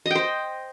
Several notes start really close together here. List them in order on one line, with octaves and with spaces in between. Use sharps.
D#5 G5 C5